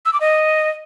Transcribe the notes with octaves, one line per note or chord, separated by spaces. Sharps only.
E6
D6
D#5